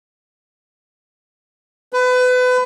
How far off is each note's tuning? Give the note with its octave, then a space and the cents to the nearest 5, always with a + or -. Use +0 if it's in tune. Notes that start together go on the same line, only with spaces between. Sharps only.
B4 +30